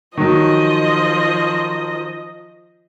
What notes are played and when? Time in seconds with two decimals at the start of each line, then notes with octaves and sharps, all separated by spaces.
0.17 D#3 F3 F#3 D#5